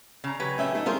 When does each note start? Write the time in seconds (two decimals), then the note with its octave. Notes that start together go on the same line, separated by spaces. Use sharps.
0.24 C#3 A#5
0.40 F#3 G4 B4 G#5
0.58 A3 C#4 E5
0.75 A3 D#4
0.86 G3 A#3 C4 F4 G#4 A#4 C5